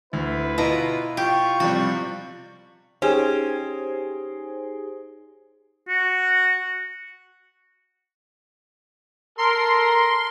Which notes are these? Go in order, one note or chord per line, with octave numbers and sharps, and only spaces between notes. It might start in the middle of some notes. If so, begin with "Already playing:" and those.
D2 E4 B4
B2 E4 F4 A#5
F4 G4 C#6
C3 F3 G3 F#4
C#4 D#4 G4 G#4 C5 G#5 E7
F#4
A4 A#4 C6